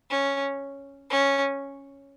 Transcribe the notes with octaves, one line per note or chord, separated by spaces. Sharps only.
C#4
C#4